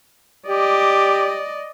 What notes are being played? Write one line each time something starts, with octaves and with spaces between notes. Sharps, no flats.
G4 D5 D#5